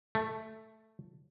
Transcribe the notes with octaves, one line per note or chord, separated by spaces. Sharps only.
A3